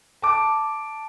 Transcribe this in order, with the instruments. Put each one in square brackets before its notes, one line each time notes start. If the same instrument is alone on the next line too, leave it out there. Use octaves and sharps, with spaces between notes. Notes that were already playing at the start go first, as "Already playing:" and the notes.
[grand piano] A5 D6